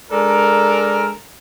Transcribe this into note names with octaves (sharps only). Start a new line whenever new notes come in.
G#3 D4 A4 A#4